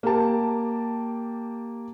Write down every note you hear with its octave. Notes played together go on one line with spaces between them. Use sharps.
A#3 G4 A5